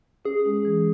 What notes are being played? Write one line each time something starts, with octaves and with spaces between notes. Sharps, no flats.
C#4 G#4
G#3
E3